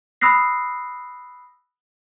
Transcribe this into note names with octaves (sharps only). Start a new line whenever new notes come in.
B5 D#6 E6 F#6 A#6 C7